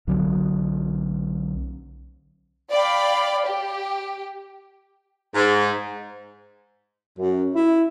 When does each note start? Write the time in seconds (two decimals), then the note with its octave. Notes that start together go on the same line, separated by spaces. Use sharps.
0.07 B1 D3 F#3
2.71 D5 F5 G5 B5
3.47 G4
5.35 G#2
7.17 F#2
7.54 E4